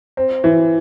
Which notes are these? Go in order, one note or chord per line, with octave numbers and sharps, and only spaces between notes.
C4
E3